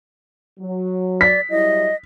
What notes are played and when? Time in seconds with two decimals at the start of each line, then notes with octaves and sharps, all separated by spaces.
0.59 F#3
1.21 D5 B6
1.50 F#3 G3 E4 D#5